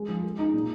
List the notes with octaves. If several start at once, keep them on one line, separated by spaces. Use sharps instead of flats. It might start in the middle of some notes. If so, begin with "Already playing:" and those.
Already playing: G#3
F3
G#3
D#4
A#2